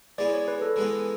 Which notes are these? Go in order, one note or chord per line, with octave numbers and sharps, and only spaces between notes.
E3 G#3 B3 D5
C#5
B4
A4
E3 G#3 B3